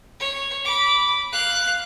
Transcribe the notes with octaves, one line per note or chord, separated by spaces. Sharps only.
C#5
B5 D6
F5 F#6